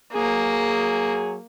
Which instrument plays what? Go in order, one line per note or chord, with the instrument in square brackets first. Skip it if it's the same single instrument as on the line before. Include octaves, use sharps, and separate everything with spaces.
[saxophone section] F#3 G#4 [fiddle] A#3